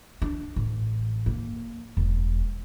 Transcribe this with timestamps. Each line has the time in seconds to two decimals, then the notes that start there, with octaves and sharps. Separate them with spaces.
0.22 D4
0.56 A1
1.26 A#3
1.97 E1